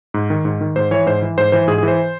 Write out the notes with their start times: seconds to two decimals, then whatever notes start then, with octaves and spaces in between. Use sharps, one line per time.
0.14 G#2
0.30 D#3
0.45 G#2
0.61 D#3
0.76 G#2 C5
0.91 E3 C#5
1.06 G#2 C5
1.22 E3
1.37 G#2 C5
1.52 E3 C5
1.67 G#2 G#4
1.78 G#4
1.83 E3
1.88 C5